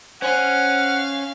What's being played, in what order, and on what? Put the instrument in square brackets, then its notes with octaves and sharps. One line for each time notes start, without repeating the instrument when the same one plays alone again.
[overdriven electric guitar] C#4 [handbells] C5 G#5 [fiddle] F5 [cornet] F#5